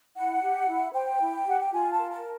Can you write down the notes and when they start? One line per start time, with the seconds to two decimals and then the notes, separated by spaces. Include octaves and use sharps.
0.15 E4 F#5
0.41 G4
0.67 E4
0.93 C5 G5
1.19 E4
1.46 G4 F#5
1.60 G5
1.72 F4 G#5
1.92 A5
1.98 A#4
2.11 A5